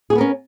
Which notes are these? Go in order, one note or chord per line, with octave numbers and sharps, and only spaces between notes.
B3 C#4 F#4 G#4 A#4